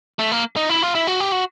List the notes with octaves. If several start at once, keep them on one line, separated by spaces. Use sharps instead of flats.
A3
A#3
D#4
E4
F4
E4
F#4
G4
F#4